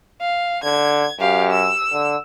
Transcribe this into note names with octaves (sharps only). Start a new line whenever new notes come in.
F5
D3 G#6
F#2 G4 F5
E6
D3